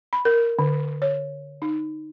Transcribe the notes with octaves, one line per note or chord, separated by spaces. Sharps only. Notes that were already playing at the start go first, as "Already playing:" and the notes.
B5
A#4
D3
C#5
D#4